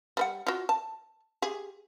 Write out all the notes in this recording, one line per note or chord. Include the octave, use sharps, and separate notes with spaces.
G3 B4 F#5
F4 F#4
A5
G4 G#4